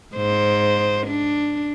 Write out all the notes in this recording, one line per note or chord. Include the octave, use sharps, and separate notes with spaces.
G#2 C5
D4